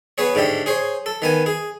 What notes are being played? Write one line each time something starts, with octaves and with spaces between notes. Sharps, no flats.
B3 G#4 C#5
G#2 D3 A3 G4
G#4 C5 C#5
A4
D#3 B3 G#5
G#4